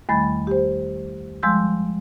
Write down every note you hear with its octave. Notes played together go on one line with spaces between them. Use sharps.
E2 D#3 G3 A3 B5 A6
G4 C5
F3 G3 G#3 C6 E6 G6